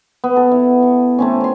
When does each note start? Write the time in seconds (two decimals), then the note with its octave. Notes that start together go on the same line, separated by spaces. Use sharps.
0.24 B3
0.36 A4
0.52 E4
0.83 C#6
1.19 A3 C4 C#4
1.41 C#5 C6